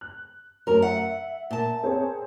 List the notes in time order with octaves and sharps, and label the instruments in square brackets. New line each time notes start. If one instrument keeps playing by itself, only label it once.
[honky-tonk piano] F#6
[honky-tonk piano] F#2 A3 C#5 [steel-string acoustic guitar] A#4 A#5
[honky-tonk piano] E5 [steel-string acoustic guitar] F#5
[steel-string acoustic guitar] A#2 A5
[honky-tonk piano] C4 G#4 C#5